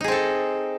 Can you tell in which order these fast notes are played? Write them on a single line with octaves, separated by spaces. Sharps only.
D#4 G#4 C4 A4